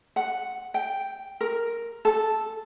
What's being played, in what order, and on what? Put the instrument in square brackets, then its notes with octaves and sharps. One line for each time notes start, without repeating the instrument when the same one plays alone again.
[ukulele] F#5
G5
A#4
A4